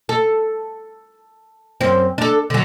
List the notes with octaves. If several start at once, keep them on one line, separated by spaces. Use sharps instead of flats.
A4
F#2 C4
D4 A4
D3 F#3